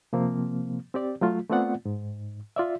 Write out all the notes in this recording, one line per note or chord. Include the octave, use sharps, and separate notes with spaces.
C3 F3 A#3 C4
C4 G4 D5
F#3 A3 F4
A3 B3 C4 F4 D5 F#5
G#2
F4 D5 E5